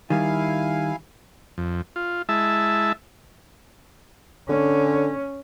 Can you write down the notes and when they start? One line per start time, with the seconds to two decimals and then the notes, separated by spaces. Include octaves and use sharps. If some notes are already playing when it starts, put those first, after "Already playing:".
0.10 D#3 G3 E4 F5 G#5
1.58 F2
1.96 F4
2.29 G#3 E4 E5 A5
4.49 D3 C#4